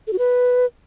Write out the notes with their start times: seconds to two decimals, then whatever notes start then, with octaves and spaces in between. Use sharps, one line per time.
0.07 A4
0.13 F#4
0.18 B4